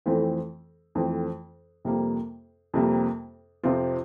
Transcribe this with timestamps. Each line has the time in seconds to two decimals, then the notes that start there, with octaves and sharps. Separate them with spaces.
0.06 F2 E3 A3 C4
0.95 F2 E3 A3 C4
1.85 F2 C3 G3 A#3
2.74 F2 C3 G3 A#3
3.64 F2 C3 F3 C4 F4